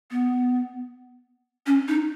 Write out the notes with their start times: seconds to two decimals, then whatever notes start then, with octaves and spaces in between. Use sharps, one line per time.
0.11 B3
1.66 C#4
1.88 D#4